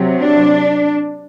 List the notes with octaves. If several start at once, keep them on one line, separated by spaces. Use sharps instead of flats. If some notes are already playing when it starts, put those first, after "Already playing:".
Already playing: C3 F#3
D4